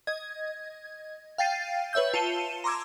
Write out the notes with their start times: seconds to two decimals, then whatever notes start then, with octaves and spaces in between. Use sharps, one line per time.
0.07 D#5 G#6
1.38 F5 G5 A6 C7 D#7
1.93 B4 C#5 E5 E6 G6
2.14 F4 A5 C#7 D#7 E7 G7
2.64 A#5 C6 D6 E6 G#6